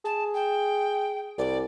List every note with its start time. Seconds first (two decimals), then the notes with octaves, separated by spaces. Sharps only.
0.05 G#4 A5
0.34 G5
1.38 C2 D5